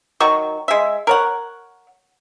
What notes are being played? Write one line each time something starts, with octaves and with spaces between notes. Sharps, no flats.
D#3 F#3 F#4 C#6
G#3 E5
A#4 C#5 F#5